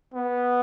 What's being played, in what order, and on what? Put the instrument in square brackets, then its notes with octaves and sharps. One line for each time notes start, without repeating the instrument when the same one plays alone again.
[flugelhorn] B3